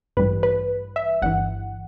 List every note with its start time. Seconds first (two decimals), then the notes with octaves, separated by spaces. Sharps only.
0.17 A1 G2 E3 G3 B4
0.43 B4
0.96 E5
1.22 G1 G2 E3 F#5